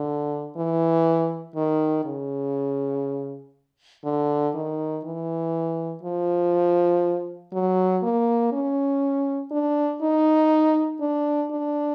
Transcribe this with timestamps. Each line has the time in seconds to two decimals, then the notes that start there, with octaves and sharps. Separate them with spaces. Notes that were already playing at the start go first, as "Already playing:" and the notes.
Already playing: D3
0.57 E3
1.55 D#3
2.05 C#3
4.05 D3
4.55 D#3
5.05 E3
6.03 F3
7.53 F#3
8.03 A#3
8.53 C#4
9.51 D4
10.02 D#4
11.01 D4
11.52 D4